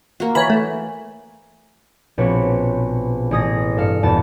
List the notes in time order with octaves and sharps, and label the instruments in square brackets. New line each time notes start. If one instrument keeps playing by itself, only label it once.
[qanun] A#3 F#4
[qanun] E3 [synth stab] C#5 B5
[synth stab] A3
[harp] A#1 B2 C4 B4 C#5
A1 G#4 D#6 A#6
G2 A4 F5 C#7
E1 E2 A#2 B3 A5